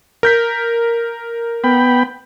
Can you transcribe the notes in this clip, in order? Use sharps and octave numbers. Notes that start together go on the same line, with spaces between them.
A#4 G6 B6
B3 G5 B5